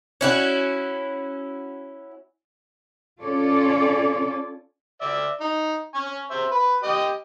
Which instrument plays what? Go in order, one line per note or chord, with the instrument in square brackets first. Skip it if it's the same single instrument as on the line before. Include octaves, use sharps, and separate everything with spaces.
[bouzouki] C#4 E4 F#4
[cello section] C#4 F4 A4 C#5 D5
[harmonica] D5 E5
D#4
G#5 C#6
C5 E5
B4
G4 D#5